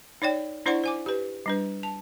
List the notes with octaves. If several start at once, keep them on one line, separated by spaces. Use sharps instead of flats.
D#4 C#5 D5 G5
D4 E4 C5 D5 F#5 C#6
C5 G#5 D6
G4 B4
G3 D4 B4
A5